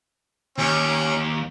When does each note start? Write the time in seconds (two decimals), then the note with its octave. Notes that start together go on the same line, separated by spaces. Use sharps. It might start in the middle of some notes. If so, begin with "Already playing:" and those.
0.58 D#2 C#4